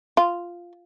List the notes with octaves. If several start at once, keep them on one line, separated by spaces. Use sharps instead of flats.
F4